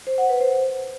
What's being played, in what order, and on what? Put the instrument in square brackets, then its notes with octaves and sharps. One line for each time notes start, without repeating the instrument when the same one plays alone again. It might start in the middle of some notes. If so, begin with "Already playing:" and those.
[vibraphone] C5
F#5
B4
C5